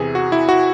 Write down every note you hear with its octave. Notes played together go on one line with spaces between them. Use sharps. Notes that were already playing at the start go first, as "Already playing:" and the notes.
Already playing: E2 C3 E3 G#4
F#4
E4
F#4